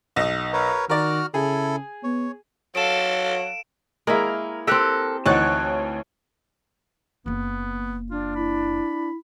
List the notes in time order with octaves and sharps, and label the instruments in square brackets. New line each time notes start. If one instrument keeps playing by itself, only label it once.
[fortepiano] B1 D#5
[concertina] A#4 B4 C#5
[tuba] D#3 [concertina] F#4 F6 [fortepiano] A#4 D5
[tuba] C#3 [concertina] E4 A4 [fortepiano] G#4
[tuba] B3 [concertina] C#5
[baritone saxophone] F#3 [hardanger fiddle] A4 F5 [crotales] D7 E7
[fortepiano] G#3 [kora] A#3 E4 [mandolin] A#4
[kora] C4 G4 [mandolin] A4 A#4 F#6
[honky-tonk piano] D2 E3 C#5 [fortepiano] D#4 F#5 [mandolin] A5 C#6 F#6
[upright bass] F#1 A#3 [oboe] B3
[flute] D4 [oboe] F4
[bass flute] E4 [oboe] B5